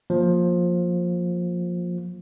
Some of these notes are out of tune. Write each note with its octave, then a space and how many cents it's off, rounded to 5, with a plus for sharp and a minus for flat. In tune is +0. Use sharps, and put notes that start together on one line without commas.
F3 +15 A#3 +0